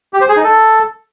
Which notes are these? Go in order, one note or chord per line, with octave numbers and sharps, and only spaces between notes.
G4
C5
G#4
D#4
A4